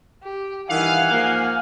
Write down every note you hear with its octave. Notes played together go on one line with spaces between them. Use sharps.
G4
G2 D#3 E3 F5 F#5 G#5
G#2 F3 A#3